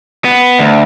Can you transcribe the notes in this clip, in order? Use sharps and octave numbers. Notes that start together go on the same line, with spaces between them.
B3
D2